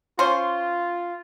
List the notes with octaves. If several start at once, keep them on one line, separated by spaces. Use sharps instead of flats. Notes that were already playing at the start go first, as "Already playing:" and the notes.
C#4 F4 C5